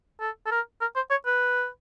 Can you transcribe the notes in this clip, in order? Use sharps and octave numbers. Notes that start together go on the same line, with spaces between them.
A4
A4
A#4
A#4
C5
C#5
B4